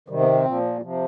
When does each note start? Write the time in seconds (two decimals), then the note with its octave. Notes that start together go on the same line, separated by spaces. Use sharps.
0.08 C3 D#3 G3
0.20 B3
0.33 C4
0.45 A#2 F3
0.82 C3 F3